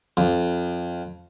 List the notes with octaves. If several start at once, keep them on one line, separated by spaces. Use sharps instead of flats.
F2